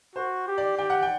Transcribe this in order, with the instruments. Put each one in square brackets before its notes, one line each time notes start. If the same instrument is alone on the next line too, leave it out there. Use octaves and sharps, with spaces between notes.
[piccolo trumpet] F#4 [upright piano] C5
[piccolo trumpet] G4
[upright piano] D5
[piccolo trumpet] G4 [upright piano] G5
[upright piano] F#5
G5